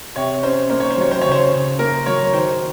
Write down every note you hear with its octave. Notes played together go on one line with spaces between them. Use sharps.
C3 C#5
C#4 C5
A#3 C5
C#5
C5
F#3 C#5
C5
C#3 C#5
C5
C#3
A#3 A#4
F#3 C#5
D#3 C5